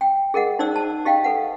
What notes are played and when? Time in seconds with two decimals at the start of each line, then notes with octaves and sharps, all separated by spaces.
0.01 G5
0.34 G#4 A#4 D#5 F#5
0.59 D#4 C5 D5 E6
0.76 A5
1.05 G4 D#5 F5 G5
1.24 A4 B4 F#5